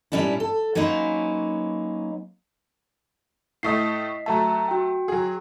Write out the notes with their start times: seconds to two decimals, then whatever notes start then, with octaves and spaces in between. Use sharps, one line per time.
0.12 A#2 G3 A#3 C#4 D4 E4
0.40 A4
0.75 F#3 A#3 C#4 D#4 B4 C5
3.63 A2 A3 D#5 D#6 B6 C7
4.26 F#3 A3 E5 A5 A#5
4.68 F#4 G5
5.08 F#3 G#4